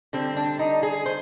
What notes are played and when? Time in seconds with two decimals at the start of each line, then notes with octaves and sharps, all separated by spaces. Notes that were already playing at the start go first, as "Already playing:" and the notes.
0.13 D3 G3 C4
0.36 D4
0.59 D#4
0.83 G#4
1.06 C5